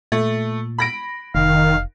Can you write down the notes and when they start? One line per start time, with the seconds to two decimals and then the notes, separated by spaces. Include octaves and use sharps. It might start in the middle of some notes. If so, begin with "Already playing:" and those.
0.12 A#2 A3
0.78 B5 A#6 D7
1.35 F1 D#3 F5